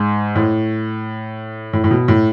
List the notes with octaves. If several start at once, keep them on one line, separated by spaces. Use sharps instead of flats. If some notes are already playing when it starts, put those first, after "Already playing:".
Already playing: G#2
A2
A2
A2
B2
A2